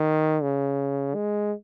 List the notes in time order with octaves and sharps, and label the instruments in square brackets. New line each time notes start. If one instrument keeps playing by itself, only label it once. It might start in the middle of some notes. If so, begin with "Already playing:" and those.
Already playing: [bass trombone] D#3
C#3
G#3